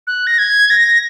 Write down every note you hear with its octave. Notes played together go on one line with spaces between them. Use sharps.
F#6
A#6
G#6
A#6